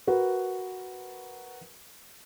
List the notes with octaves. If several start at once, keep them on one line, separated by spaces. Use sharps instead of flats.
F#4 A#4 B4